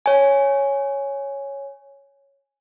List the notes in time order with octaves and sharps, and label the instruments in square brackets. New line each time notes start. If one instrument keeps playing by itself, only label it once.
[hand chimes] C#5 G#5